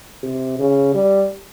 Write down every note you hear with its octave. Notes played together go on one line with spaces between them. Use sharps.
C3
C#3
G3